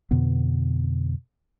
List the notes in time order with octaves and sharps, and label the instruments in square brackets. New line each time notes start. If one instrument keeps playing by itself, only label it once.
[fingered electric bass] F2 B2 D3 B3